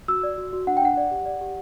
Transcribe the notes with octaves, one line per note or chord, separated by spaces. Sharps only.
F#4 E6
D5
F#4
F#4
D4 F#5
G5
D4 F#5
D5
G4
D5
G4